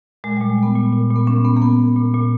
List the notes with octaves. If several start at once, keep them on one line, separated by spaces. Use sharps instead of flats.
A#2 G#3
A#2 G3
G#3
A#2 B3
A#2
A#2
A#2
B3
A#2 C#4
A#2 B3
A#3
A#2 B3
A#2
A#2
A#2